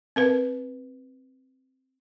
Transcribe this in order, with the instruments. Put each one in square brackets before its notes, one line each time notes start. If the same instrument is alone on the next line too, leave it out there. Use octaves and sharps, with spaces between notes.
[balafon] C4 A#4 B4